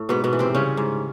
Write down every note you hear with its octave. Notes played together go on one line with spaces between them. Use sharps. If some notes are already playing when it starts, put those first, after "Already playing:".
Already playing: A2
G#2 B2 B3
B2 B3
E3
C3 C4
C#3 G3 C#4
G#2